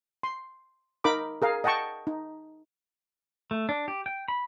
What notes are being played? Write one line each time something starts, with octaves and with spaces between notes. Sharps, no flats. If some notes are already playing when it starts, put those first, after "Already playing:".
C6
D#4 A#4 B5 D6
G#4 A#4 F5
D#5 F#5 G5 A5 C#6
D#4
A3
D4
G4
G5
B5